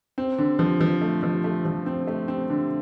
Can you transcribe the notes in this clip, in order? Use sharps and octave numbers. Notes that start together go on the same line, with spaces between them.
C4
D3
F3
F3
A3
F3
A3
F3
C4
A3
C4
D3